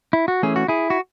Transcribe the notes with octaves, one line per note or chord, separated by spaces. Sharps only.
E4
F#4
E3 A3 C#4 G#4
F#4
E4 G#4
F#4